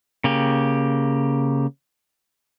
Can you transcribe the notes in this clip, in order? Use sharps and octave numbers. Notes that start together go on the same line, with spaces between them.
C#3 A#3 G4